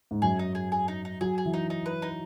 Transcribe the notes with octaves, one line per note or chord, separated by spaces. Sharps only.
G#2
F#2 G#4
D#4
G#4
G#4
D#4
D#4
F#3 G#4
G#4
E3
D#4
D#4
B4
D#4